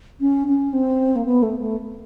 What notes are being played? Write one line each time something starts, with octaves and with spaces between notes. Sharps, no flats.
C#4
C#4
C4
A#3
B3
A3
A3